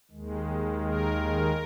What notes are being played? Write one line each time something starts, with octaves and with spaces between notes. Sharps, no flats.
D#2 D#3 G#3
A#4